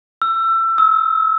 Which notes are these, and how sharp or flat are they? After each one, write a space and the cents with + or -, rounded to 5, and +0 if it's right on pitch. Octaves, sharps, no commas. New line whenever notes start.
E6 +25
E6 -30